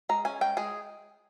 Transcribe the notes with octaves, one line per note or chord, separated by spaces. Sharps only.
G#3 A#5
C#4 G#5
G#3 G5
G#3 G#4